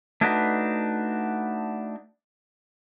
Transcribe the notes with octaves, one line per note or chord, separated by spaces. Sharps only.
A3 D4 D#4 F#4 G#4 B4